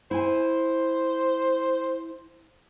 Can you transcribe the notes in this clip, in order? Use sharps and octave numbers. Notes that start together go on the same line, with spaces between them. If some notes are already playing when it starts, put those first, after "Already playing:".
E4 C5 G#5